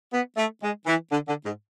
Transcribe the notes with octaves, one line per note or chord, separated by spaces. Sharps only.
B3
A3
G#3
E3
D3
D3
G#2